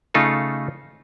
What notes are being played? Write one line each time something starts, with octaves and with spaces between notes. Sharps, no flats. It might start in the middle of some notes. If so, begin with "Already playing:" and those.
C#3 A3 D#4 F4 A4